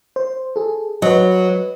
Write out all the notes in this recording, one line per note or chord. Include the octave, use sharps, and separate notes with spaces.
C5
G#4 A4
F#3 B4 D#5